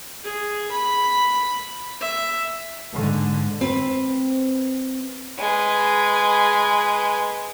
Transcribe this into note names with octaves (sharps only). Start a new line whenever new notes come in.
G#4
B5
E5
G#2 D3
C4 B4
G#3 B4